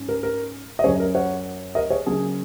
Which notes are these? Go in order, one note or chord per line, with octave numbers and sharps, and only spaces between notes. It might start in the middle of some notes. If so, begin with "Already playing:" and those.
Already playing: G#2 G#3 C#4
A#4
A#4
D#5
F#2 F#3 C#4 G#4 C#5
A#4
C#5 F#5
A#4 D#5
G#4 C#5
C#3 F#3 A#3 C#4 G#4